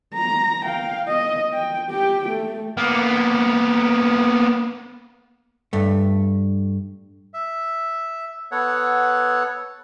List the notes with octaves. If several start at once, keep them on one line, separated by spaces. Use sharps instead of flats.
A#5
F5 G5
D#5
G5
G4 G5
A3
A#3 B3
G2 A3
E5
B3 A4 C#5 F#5